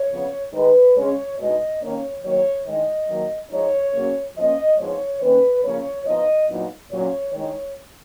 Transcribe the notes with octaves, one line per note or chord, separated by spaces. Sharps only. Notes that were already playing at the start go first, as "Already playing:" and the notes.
Already playing: C#5
C#3 F3 B3
D#3 G#3 D#4 B4
C#3 G#3 C#4 C#5
B2 G#3 D#4 D#5
D#3 A#3 C#4 C#5
D#3 F#3 A#3 C#5
D#3 G#3 D#4 D#5
D#3 F#3 A#3
F3 G#3 D#4 C#5
C#3 F#3 A#3 C#4
F3 A#3 C#4 D#5
F3 G#3 B3 D#4 C#5
D#3 A#3 C#4 B4
C#3 F3 A#3 C#4 C#5
F3 B3 D#4 D#5
A#2 F#3 B3 D#4
A#2 F#3 C#4 C#5
D#3 G#3 D#4 C#5